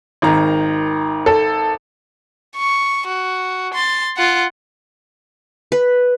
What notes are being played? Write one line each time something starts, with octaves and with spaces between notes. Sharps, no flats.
G#1 D#3 A#5
A4
C#6
F#4
C6 A6
F4 F#5
B4